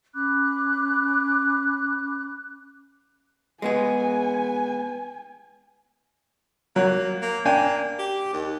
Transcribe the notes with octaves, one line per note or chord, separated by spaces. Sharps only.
C#4 B5 D6 F#6
G#3 B3 G#4 G#5
F#3 A#3
A#3
A#3 D4 G5 G#5
G4
D#2